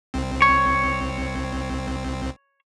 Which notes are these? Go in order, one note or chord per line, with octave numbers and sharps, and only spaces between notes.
C2 C4
C#5